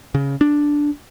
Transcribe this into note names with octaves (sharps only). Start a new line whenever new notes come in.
C#3
D4